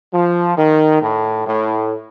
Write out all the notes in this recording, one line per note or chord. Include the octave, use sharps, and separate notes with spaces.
F3
D#3
A2
A2